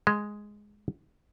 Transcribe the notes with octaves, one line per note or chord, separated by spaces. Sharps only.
G#3